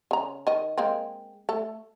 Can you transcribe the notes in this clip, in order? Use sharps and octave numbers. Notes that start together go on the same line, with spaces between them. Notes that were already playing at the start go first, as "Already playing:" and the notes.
C#3 A#5
D#3 D#5
G#3 A#3 C4
A3 A4